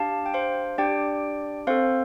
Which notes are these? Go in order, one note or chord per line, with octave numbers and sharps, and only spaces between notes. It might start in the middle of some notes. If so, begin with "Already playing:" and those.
Already playing: D4 G4 F5 A5
G5
C5 F5
D4 G4 D5 G5
C4 A4 C5 F5